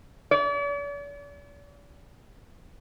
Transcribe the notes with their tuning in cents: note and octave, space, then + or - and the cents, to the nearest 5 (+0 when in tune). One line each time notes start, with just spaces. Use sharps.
D5 -45